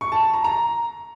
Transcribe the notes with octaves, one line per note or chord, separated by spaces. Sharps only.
C#6
A5
A5
A#5
A#5